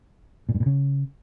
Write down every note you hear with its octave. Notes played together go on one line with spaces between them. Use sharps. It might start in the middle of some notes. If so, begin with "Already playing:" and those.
A#2
G2
A#2
C#3